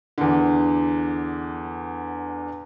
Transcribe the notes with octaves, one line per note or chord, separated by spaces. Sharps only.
E2 D3